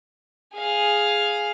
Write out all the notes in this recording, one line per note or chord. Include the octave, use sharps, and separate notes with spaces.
G#4 F5